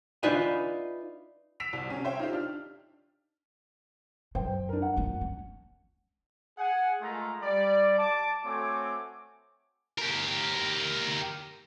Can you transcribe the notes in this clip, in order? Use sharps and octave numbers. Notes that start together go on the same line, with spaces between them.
D4 D#4 F4 B4 E5 G#5
E6 B6 D7 E7 F7
C2
C3 C#4
C5 C#5 E5 G5
D#4 F4 G4
D4 F6
F#2 C5 G5
D4 A#4
F#5
F2 A#3
C#4
G#4 F#5 G#5
G#3 A3 F4 G#4 A#4 A#5
G3 D5
A5 D6
A3 C4 F#4 C#5 G#5 D6
G4 A#4